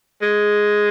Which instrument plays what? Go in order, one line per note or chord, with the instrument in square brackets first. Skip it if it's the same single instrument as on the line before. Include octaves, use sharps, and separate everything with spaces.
[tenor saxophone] G#3